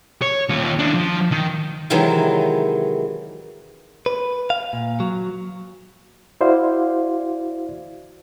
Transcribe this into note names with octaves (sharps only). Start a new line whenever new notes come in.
C#5
D#2 F4
E3 D4
F3
D#3
C3 D#3 E3 F#3 G#3
B4
F5
A#2
F#3
E4 F#4 C5 D5 F5